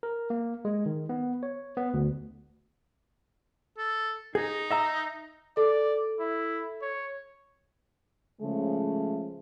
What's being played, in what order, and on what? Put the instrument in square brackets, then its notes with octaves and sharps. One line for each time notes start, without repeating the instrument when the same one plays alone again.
[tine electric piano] A#4
A#3
G#3
D#3
B3
C#5
B3
D2
[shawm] A4
[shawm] D#4 [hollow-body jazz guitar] G#4
[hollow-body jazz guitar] D#5 E5 A#5
[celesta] A4 [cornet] D5
[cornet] E4
C#5
[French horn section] C#3 F3 G#3 A3